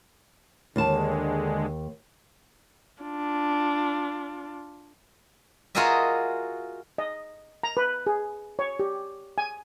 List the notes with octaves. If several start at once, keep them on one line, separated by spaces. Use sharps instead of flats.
D#2 D3 G#3 A5
D4 F4
F4 F#4 G#4 A#4 D#5 E5
D#5
A#5
B4
G#4
C#5
G4
G#5